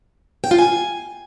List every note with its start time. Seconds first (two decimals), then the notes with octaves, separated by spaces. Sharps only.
0.44 G5
0.51 F4
0.59 G#5